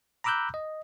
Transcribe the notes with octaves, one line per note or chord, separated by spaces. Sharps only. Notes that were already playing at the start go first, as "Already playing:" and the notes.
A#5 B5 D6 E6 F#6 G6
D#5